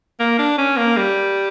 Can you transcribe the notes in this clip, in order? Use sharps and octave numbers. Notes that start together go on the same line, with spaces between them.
A#3
D4
C#4
A#3
G3